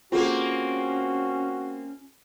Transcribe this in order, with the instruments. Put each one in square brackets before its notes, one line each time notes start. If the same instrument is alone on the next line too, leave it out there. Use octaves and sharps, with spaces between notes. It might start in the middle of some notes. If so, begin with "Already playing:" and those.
[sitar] A#3 C4 [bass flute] C#4 [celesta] F4 G#4 A4 [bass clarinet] F#4